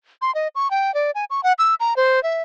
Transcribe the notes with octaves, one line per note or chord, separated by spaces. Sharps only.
C6
D#5
C#6
G5
D5
G#5
C#6
F#5
E6
A#5
C5
E5